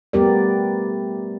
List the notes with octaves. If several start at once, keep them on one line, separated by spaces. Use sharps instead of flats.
G3 A3 B3 G4 A#4 D5